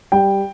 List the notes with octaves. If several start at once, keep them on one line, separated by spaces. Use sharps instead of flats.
G3 G5